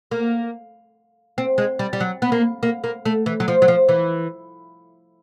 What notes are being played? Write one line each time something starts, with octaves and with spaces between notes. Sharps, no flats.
A#3
C4
G#3
G3
G3
F#3
B3
A#3
A#3
A#3
A3
E3
F#3
F3
F#3
F3
E3